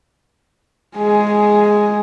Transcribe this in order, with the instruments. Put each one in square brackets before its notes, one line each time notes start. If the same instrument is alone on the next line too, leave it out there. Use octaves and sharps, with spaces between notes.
[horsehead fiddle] G#3 G#4